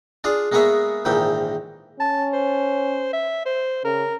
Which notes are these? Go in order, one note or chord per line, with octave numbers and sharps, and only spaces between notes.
D4 F4 G#4 D5
G#3 A#3 B3 G#4 C#5 E5
A#1 G#2 D#3 E3 G4 G5
C#4 A5
C5
E5
C5
C#3 A#4